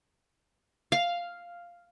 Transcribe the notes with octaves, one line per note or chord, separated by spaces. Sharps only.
F5